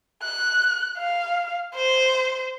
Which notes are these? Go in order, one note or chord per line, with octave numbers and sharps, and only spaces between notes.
F#6
F5
C5